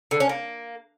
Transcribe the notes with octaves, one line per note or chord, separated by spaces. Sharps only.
D3
C#4
A#3